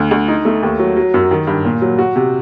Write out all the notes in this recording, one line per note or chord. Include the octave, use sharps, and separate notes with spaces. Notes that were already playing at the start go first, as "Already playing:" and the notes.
Already playing: D2
D2
D#4
A3
D#2
F#3
F#3
F#2
D#3
G2
A#2
F#3
F#4
C3